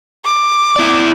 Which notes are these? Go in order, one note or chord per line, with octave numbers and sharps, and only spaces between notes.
D6
E4 D5